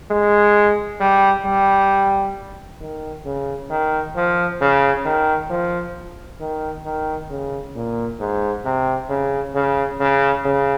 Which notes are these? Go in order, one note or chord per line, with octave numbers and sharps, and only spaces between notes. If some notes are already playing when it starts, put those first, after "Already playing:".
G#3
G3
G3
D#3
C#3
D#3
F3
C#3
D#3
F3
D#3
D#3
C#3
A#2
G#2
C3
C#3
C#3
C#3
C#3